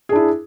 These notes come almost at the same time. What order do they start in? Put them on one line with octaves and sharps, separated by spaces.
G#4 D4 E4